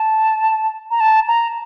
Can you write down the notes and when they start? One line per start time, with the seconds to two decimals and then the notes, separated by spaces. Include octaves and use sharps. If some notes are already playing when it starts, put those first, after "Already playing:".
Already playing: A5
0.91 A#5
1.00 A5
1.28 A#5